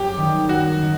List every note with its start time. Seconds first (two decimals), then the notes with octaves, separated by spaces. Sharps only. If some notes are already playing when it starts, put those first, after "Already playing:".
Already playing: F#2 C4 G4 G#4
0.17 D#3 G3
0.49 F#2 F#4
0.83 D#3